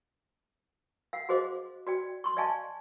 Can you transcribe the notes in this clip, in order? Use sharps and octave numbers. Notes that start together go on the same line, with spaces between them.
F5 F#5
F#4 G#4 C5 D#5 F5 D6
F#4 D5 G5
C6 C#6
D5 D#5 F5 G#5 A5 C#6